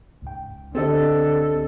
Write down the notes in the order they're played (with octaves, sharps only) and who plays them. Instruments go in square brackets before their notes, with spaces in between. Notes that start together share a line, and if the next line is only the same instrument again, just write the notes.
[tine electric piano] C#2 G#2 G5
[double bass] D3 [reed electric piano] C4 G4 D#5 [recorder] A4